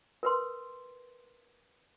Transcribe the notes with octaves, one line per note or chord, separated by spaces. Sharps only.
A#4 B4 C6